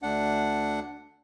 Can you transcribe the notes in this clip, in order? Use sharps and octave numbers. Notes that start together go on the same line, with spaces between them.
D2 D4 F#5